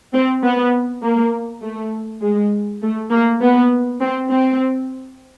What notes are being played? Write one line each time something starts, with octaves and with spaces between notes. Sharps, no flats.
C4
B3
A#3
A3
G#3
A3
A#3
B3
C4
C4